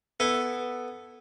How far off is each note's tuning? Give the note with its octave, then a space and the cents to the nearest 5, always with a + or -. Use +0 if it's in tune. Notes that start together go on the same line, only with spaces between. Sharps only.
B3 +0 E4 +0 A4 +0